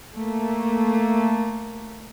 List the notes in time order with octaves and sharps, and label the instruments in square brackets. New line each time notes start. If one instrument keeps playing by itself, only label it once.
[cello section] A3 A#3